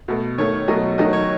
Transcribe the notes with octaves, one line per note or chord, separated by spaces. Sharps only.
B2 A3
D#3 A3 C#5
B2 F#3 A3 D#5
D#3 F#3 A3 D#5
C#5